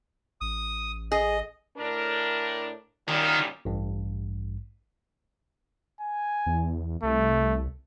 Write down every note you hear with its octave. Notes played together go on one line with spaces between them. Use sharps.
A1 D#6
G#4 D#5
A2 D4 A#4
F#2 A#2 D#3 G3
A1 G2
G#5
E2
C2 A3